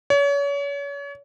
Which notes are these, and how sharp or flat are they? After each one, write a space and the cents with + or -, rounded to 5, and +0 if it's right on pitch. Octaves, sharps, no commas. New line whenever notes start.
C#5 +35